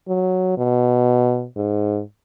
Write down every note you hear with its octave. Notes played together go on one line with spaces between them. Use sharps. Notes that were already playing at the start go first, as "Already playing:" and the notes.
F#3
B2
G#2